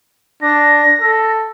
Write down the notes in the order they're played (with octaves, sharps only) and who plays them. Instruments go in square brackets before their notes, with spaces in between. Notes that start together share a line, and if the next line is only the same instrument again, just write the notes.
[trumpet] D4 [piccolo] A#6
[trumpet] A4